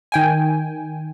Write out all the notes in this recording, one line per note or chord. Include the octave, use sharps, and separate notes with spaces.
D#3 G5 G#5